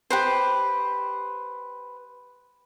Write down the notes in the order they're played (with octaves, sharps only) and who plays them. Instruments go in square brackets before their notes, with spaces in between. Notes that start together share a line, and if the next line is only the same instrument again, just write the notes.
[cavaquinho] G4 B4 C5